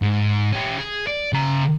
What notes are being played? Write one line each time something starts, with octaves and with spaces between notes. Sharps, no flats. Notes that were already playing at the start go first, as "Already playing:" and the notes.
G#2
C#4 G4
G#4
D5
C#3 A#5